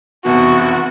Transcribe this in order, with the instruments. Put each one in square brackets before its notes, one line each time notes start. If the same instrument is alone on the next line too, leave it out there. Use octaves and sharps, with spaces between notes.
[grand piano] F1 E2 B2 [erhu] F#4